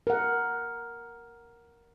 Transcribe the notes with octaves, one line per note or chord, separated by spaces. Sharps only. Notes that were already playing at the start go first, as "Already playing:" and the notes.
A#4 F#5